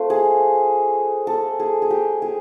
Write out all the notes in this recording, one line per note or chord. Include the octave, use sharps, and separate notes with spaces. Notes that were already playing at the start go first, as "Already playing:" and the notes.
Already playing: A3 C4 F4
G#4
A4
G#4
G#4
G4
G#4